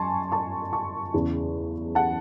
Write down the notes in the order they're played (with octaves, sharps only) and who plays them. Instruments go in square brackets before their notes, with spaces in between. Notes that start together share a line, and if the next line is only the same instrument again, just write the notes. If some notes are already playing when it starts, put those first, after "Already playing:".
Already playing: [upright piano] F#2 G#5 A5 C6 C#6
A5 C#6
A5 C#6
E2 C#3 E3
F#5 A5